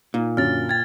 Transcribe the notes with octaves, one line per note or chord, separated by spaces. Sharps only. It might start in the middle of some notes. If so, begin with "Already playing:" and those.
A#2 D#4
F#2 D3 F6 A6
G5 G#6 A6